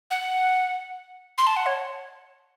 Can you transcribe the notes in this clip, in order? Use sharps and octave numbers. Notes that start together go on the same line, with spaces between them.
F#5
C6
A5
F#5
C#5